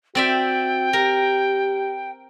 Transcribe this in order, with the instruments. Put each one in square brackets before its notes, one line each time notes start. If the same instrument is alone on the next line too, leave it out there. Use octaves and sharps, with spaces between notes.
[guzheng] C4 D5 E5 [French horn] F#4 [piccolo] G5
[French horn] G4 [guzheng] A#4